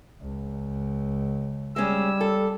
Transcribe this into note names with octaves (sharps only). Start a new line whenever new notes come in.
C#2
G3 G#3 C#4 E6
A4